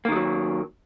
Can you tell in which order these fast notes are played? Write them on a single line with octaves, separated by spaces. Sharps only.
A#3 D#3 G#3 F#3